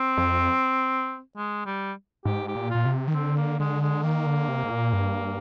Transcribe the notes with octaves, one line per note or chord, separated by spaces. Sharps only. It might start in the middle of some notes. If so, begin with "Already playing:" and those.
Already playing: C4
F2
G#3
G3
G#2 G4
G4
A#2
A#2 F4
C3
D#3
D3 C4
A#3
D3 G#3
G#3
D#3 A#3
D3
C3
G#2
A#2
G2